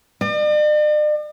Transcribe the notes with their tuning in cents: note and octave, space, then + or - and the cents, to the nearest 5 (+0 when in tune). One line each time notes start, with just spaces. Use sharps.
D5 +45